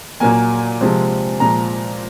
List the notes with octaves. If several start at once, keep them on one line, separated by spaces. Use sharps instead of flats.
A#2 F#3 A#3 G#5
C3 F3 G#3 C4
A#2 F3 G#3 A#5